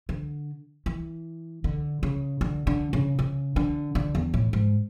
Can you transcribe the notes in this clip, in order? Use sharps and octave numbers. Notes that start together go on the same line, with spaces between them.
D3
E3
D3
C#3
D3
D3
C#3
C#3
D3
D3
E2
A2
G#2